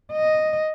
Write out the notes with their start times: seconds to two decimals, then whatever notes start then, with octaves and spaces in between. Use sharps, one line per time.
0.13 D#5